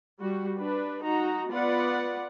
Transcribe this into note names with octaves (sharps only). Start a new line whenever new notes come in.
G3 F#4
D4 B4
D#4 F#4 A#5
B3 F4 B4 D5 F#5